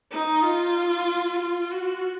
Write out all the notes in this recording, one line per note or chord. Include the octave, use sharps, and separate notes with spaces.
D#4
F4
F4
F#4